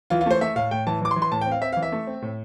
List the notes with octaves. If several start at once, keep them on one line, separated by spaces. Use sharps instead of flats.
E3 F4
F4
A3 C5
A3 E5
A2 F5
A2 G5
E3 A5
E3 D6
C6
E3
C6
A2 A5
G5
C4
F5
C4 E5
F5
E3
E5
A3
C4
A2